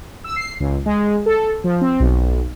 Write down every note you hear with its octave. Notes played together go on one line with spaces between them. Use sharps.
E6
C7
C#2
G#3
A4
F3
C4
B1